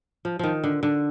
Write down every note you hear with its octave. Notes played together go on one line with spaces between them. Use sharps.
F3
D#3 F3
D3
D3